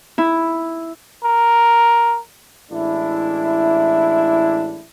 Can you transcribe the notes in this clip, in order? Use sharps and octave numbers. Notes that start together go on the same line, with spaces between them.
E4
A#4
A1 G#3 D4 E4